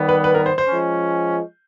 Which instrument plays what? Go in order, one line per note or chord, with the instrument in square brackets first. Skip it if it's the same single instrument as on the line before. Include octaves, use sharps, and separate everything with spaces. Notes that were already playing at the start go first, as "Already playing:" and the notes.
Already playing: [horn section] D#3 G3 B3
[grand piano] B4
B4
A#4
C5
C5
[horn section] F3 G#3 C#4